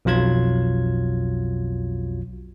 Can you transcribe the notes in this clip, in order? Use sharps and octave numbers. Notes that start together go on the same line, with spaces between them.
B1 F2 F#3 F4 G#6